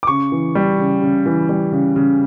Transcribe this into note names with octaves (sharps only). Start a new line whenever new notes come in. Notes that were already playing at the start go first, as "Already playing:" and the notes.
D6
C#3 C#6
E3
G3
C#3
C#3
E3
G3
C#3
C#3